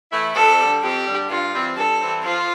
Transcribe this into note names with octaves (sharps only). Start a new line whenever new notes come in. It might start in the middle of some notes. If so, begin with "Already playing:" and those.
E3 A3 E4
F2 A4
D3 G3
F2 G4
D3 G3
G2 F4
E3 G3 C4
G2 A4
E3 G3 C4
F3 F4